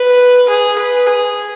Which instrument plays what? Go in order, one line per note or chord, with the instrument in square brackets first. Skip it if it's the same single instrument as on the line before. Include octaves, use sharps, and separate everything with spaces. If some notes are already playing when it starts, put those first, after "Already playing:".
Already playing: [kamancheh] B4
G#4
B4
G#4